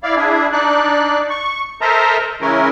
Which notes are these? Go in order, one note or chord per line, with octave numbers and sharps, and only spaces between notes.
E4 D5 F5
D4 E4 G#4
D4 D#4 D5 F#6
C#6
A4 A#4 C5 D#5 E5 A#5
C#3 E3 G#3 C#4 E4 A#4